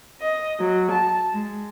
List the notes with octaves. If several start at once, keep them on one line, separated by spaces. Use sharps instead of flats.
D#5
F#3
A5
G#3